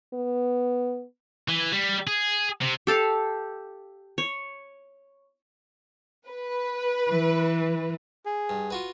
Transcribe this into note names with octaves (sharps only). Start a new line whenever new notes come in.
B3
E3
G3
G#4
C3
G4 A4 F5
C#5
B4
E3
G#4
G2
F4 F#4 B4